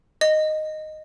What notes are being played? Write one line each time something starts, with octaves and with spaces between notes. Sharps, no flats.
D#5